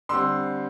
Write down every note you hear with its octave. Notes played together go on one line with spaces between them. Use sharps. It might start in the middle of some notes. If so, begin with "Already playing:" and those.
D3 G3 C4 C6 E6